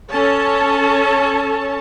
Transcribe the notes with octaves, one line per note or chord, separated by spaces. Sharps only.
C#4 A4 C#5 A5